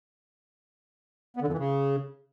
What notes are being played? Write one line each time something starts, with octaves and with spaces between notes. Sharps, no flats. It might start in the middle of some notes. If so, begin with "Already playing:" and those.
B3
D3
F2
E3
C#3